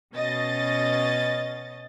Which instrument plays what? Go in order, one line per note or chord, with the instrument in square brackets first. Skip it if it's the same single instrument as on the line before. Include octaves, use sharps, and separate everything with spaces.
[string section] B2 C#4 D#5 A6